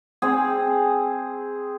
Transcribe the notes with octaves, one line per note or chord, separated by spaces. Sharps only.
C4 G#4